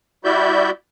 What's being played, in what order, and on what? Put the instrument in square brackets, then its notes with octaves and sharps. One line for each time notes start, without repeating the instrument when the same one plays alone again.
[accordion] G3 E4 F#4 D5 E5 G6